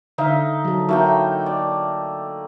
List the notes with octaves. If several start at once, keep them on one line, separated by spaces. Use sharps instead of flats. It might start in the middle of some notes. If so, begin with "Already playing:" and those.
D3 D#4 E5 F5
F#3 A4
A3 A#3 E4 F#4 G5
D5